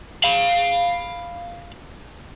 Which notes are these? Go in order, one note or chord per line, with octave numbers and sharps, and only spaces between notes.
F5 B5